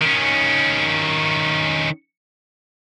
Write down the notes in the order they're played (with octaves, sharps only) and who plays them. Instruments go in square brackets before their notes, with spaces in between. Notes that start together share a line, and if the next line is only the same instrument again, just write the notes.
[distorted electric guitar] D#3 C#4